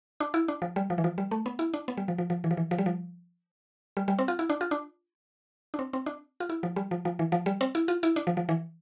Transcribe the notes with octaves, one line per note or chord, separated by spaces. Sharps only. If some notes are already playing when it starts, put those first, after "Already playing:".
D4
E4
D4
F3
G3
F3
E3
F3
G3
A3
B3
E4
D4
B3
G3
F3
F3
F3
E3
F3
E3
F3
G3
F3
G3
G3
C4
F4
E4
D4
F4
D4
D4
C4
C4
D4
F4
E4
F3
G3
F3
F3
E3
F3
G3
C4
E4
F4
E4
D4
F3
F3
E3